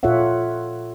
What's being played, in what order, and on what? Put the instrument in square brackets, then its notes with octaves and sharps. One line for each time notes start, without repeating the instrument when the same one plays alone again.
[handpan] A#2 F4 A4 C#5 E5 F#5